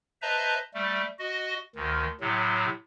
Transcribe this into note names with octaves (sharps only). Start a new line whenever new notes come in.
B4 C5 D#5 E5 A5 A#5
G3 A3
F#4 D#5
D2 D#3
A2 C3 F#3